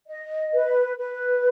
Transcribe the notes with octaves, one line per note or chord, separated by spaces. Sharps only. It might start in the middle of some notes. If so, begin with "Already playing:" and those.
D#5
B4
B4